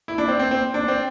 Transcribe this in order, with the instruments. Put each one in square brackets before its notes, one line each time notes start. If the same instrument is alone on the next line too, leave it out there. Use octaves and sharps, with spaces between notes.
[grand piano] E4
D4
C4
C4
C4
D4
C4